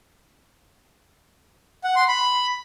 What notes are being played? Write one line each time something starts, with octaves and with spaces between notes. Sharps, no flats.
F#5
C6
B5